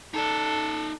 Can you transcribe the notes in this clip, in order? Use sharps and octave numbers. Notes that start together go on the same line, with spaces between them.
D#4 A4 D5